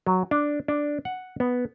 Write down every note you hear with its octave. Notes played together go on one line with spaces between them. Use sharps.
F#3
D4
D4
F#5
B3